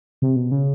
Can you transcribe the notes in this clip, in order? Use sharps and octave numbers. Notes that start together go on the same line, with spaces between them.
C3
B2
C#3